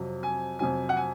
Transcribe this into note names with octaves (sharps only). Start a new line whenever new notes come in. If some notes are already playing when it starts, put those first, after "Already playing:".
Already playing: F2 C3 F#3
G#5
F2 C3 F#3 G#5
F#5
G#5